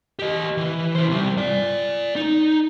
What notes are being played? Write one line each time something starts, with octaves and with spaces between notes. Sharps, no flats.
G4 D#5
E3
E4 C5
C3 G3
D5 G#5
D#4